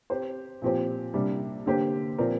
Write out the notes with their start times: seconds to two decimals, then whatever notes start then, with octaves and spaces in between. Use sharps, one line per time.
0.10 C4 G4 C5
0.62 A#2 F3 C4 G4 C5
1.14 C3 G3 A#3 D4
1.66 D3 A#3 G4 C5
2.18 A#2 F3 C4 A#4 D5